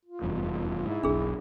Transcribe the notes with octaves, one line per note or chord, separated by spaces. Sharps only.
F4
F1 E2 G2
G#2 E4
E1 B1 D4 G#4